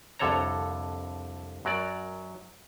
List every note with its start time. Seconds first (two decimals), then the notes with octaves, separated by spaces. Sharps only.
0.19 C2 F2 D3 A4 C#5 A#5
1.65 F#2 F#3 A#4 D5